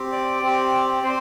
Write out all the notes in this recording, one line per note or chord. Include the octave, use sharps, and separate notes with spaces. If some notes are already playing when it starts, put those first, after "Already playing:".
Already playing: C4 G4
D5
C4 G4
C4 C5